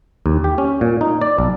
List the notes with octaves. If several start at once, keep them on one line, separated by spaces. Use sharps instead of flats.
D#2
G4
C#4
A#2
D#4
D5
B1